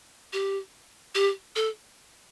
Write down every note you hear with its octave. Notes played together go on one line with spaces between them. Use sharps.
G4
G4
A4